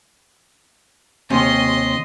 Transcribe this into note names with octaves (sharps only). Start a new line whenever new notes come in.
D#2 C3 C#4 D#5 C6